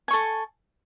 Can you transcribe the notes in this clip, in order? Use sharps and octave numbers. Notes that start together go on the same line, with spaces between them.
A4 G#5 C#6